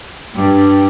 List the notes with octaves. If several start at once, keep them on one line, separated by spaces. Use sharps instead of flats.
G2 G3